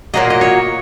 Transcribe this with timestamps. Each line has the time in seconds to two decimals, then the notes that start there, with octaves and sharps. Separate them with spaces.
0.14 A#2 F#3 A#3 D#5
0.30 D#5
0.41 C#5